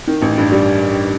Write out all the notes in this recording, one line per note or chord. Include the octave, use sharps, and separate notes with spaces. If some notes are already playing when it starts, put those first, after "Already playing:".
D#3
A1
G2
G3